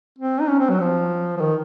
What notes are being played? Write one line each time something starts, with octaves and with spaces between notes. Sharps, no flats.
C4
D#4
C#4
C4
F#3
F3
F3
D#3